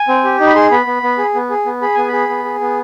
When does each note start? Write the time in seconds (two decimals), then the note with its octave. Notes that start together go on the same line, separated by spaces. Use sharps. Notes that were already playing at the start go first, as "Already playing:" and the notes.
Already playing: G#5
0.08 C4
0.24 G4
0.40 D#4
0.47 B5
0.55 G#4 C6
0.71 B3 B5
0.86 B3
1.03 B3
1.18 G#4
1.34 B3
1.50 G#4
1.65 B3
1.82 G#4 B5
1.95 B3 G#5
2.08 G#4 B5
2.29 B3
2.45 G#4
2.60 B3